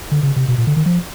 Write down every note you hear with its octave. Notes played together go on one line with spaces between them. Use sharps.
D3
C#3
C3
B2
A#2
D3
D#3
F3